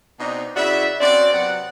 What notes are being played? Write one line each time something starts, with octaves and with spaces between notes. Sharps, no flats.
B2 C4 D4 D#4
C#3 E4 F#4 D5 E5
C4 C#4 F#4 D5
C3 F#3 B3 D5 F#5